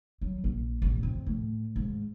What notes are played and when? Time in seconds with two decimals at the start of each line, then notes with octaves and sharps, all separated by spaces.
0.21 F#3
0.44 A#1
0.82 A1
1.03 F2
1.26 A2
1.76 G#2